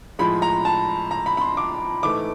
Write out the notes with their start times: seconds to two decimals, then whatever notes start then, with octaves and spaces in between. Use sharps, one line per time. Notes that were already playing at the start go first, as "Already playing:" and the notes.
0.19 A2 F3 G#3 B5
0.42 A#5
0.65 A5
1.11 A#5
1.26 B5
1.37 B5
1.41 C6
1.57 D6
2.03 G#2 E3 A3 D6